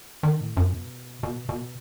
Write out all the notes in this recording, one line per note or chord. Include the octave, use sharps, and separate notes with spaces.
D#3
A2
F#2
B2
B2
B2